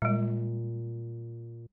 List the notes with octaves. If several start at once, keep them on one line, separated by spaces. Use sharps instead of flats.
A#2 G3 G#3